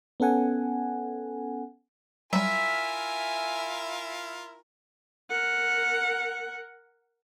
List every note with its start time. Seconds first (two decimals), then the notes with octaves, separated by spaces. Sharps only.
0.20 B3 C#4 A4 F#5 G#5
2.33 F#3 G3 E4 F4 A#4 E5 G#5
5.29 A#4 F#5